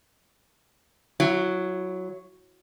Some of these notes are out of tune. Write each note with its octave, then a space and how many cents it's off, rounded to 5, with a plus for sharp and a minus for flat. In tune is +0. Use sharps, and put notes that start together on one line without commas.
F#3 +0 E4 +35